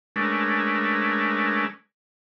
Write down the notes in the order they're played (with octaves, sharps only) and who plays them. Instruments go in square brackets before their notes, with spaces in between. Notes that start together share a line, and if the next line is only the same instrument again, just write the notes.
[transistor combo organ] G#3 A3 C#4 D4 A#4 B4